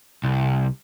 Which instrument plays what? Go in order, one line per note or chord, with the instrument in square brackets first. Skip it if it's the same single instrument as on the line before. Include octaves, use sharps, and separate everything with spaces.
[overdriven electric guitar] C2